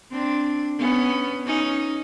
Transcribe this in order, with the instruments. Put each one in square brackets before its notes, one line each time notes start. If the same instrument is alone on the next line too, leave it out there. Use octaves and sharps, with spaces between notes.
[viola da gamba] C4 D4
B3 C#4
C#4 D#4